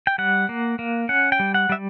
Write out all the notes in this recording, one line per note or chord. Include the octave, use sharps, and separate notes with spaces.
G5
G3 F#5
A#3
A#3
C#4 F#5
G5
G3
F#5
G3 E5